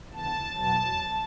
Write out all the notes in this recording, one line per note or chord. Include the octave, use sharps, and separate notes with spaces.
D2 C#3 E3 B3 A5
E2 B2 F#3 B3 A5